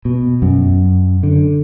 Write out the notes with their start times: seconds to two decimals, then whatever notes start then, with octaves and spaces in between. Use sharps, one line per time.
0.05 B2
0.42 F#2
1.23 D3